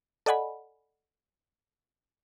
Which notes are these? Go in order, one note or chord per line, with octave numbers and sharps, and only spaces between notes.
A4 D5 D#5 F#5 G#5 B5